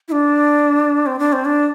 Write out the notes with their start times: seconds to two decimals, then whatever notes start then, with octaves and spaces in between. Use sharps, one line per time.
0.08 E4
0.12 D4
1.06 C4
1.19 D4
1.33 C4
1.45 D4